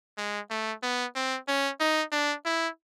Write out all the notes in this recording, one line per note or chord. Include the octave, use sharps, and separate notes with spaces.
G#3
A3
B3
C4
C#4
D#4
D4
E4